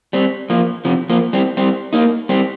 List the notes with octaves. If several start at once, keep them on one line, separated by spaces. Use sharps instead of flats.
G3 C4
F3 A#3
C3 F3
F3 A#3
G3 C4
G3 C4
A#3 D#4
G3 C4